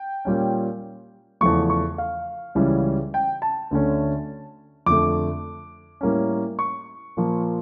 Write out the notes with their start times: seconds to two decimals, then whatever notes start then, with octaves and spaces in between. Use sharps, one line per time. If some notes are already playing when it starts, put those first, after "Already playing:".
Already playing: G5
0.25 A#2 G3 C#4
1.41 E2 C#3 F3 A3 C#6
1.70 C#6
1.98 F5
2.55 C#2 C#3 E3 G3 C#4
3.14 G5
3.42 A5
3.71 D2 D3 A3 C#4
4.86 F2 D3 A3 D6
6.01 A2 G3 A#3 C#4
6.59 C#6
7.17 A#2 F3 A#3